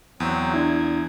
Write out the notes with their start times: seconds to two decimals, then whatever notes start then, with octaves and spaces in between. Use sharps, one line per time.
0.20 E2 F#3 C4
0.54 D4 E4 G#6